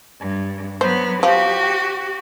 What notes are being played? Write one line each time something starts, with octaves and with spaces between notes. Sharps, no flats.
G2
F#3 B3 C5
F3 F#4 G4